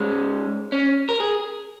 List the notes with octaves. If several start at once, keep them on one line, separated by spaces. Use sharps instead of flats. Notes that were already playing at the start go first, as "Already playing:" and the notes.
Already playing: G#2 G#3 C#4
C#4
A#4
G#4